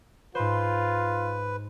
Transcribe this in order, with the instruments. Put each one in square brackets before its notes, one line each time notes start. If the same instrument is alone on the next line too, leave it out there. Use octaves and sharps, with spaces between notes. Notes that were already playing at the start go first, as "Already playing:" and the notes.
[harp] G#2 C5 [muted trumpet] F4 [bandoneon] B4